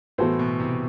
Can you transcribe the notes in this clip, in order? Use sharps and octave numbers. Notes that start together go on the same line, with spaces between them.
A2 E3 B3 F#4 A4 C5
B2
A2 C3